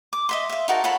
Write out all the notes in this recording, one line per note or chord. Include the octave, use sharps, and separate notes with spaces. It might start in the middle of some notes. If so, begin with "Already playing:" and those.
D6
D#5 E5 C6
E5 F5
D#4 F#4 A#4 A5
F4 A4 C#5 B5